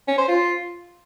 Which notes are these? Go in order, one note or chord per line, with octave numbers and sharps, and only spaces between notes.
C#4
C5
F4